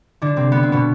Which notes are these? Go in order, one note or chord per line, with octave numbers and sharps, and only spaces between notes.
D3 D4
C3 C4
B3
C4
B2 B3